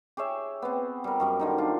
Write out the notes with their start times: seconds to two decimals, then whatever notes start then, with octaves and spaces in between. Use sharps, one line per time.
0.17 G4 G#4 C#5 E5
0.62 B3 C4
1.04 G3 A#4
1.20 F#2 G3 A#4
1.39 D3 D#3 D#4
1.58 D4 F4